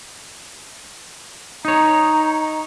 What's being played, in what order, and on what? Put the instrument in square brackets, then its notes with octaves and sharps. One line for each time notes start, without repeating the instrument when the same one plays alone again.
[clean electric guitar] D#4 C#5 [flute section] A#5